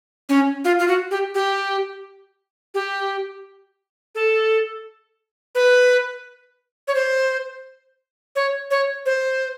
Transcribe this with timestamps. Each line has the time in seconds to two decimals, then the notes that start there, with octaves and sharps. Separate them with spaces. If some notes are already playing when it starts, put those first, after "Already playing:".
0.29 C#4
0.65 F4
0.79 F4
0.88 F#4
1.11 G4
1.34 G4
2.74 G4
4.15 A4
5.55 B4
6.88 C#5
6.95 C5
8.36 C#5
8.71 C#5
9.06 C5